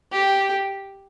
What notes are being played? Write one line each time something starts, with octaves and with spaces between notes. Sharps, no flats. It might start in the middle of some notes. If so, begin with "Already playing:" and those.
G4